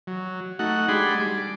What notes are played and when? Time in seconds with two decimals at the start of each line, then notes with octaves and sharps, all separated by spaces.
0.07 F#3
0.59 A3 D#4 F#4 F#5
0.88 G#3 D4 G4 G#4 B5 C6
1.19 G3 D6